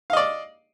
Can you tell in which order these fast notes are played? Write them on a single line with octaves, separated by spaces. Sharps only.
F5 D#5 D5